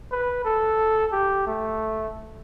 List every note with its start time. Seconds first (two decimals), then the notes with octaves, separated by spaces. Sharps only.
0.12 B4
0.45 A4
1.12 G4
1.47 A3